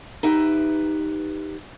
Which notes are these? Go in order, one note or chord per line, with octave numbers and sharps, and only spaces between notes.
D#4 G4 B4 E5